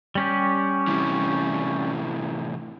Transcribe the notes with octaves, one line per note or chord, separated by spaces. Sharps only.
G3 C#4 G4
A2 C3 E3